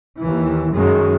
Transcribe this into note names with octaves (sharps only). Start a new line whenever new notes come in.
D#2 E3
F#2 D#3 G#3